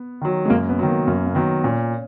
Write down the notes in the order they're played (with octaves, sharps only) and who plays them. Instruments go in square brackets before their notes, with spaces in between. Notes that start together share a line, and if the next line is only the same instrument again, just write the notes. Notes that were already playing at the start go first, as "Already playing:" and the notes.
Already playing: [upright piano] B3
[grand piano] D#3 F#3
[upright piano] G#3
[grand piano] F#2 [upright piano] A#3
[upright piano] B3
[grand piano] D#3 F#3
[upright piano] A#3
[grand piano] F#2 [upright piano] A#3
[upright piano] A#3
[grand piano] D#3 F#3 [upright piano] B3
[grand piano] A#2 [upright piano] C#4